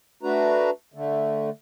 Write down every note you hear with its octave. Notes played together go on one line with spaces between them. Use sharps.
A3 D4 F#4 B4 A#5
D3 A3